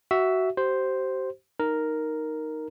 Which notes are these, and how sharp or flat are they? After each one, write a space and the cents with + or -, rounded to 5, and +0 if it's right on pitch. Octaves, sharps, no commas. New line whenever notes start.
F#4 +20 E5 +0
G4 -40 C5 +0
D#4 +0 A#4 +0